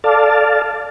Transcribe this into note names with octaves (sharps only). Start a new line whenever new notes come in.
A4 D5 F5 A5